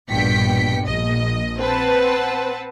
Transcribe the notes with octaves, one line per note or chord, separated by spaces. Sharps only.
A#1 G2 B2 G5 B6 C#7
A#1 D#5
C4 B4 C5 F#5 A5